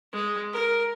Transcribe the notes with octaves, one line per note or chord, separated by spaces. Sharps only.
G#3
A#4